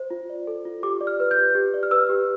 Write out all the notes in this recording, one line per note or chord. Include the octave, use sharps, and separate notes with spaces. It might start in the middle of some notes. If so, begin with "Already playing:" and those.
Already playing: C5
F4
D5
A4
F4
G4 D6
D5
F6
B4
G6
G4
G4
D5
F6
B4 E6
G4